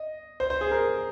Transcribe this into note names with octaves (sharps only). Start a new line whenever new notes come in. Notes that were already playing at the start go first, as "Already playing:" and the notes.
Already playing: D#5
C5
C5
G#4
A#4